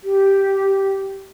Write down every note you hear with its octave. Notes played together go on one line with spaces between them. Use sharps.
G4